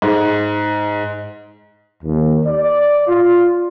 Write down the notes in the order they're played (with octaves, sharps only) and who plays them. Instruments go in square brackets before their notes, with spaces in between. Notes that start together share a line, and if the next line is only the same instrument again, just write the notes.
[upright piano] G#2
[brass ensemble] D#2
D5
F4